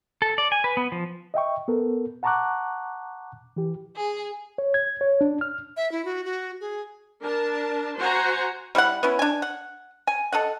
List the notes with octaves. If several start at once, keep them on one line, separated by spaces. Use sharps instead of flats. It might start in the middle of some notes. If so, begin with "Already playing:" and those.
A4
D5
G#5
B4
B3
F3
D#5 E5 G5 C#6
B3 A4 A#4
F#5 A5 A#5 C#6 D6 F#6
E3 G4
G#4
C#5
G#6
C#5
D4
F6
E5
E4
F#4
F#4
G#4
D4 A#4 A5
F#4 C5 F#5 G#5 A#5
G3 E4 C5 F#5
B3 C#4 E4
D4 G#5
F#5
G#5
A4 D#5 F#5